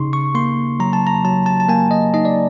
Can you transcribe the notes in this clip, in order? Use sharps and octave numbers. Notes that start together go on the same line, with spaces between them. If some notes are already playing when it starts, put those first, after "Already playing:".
Already playing: C#3 D#4 C6 C#6
C#6
A#3 C6
F#3 A#5
A5
A#5
F#3 A5
A5
A5
A#3 G#5
D#5
D#4 D#5
D5